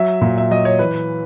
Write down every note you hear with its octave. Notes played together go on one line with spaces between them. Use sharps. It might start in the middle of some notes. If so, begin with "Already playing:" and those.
Already playing: F#3 E5
A#2
E5
F#3 D#5
C#5
E3 B4